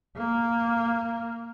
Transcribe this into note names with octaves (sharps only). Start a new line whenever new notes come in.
A#3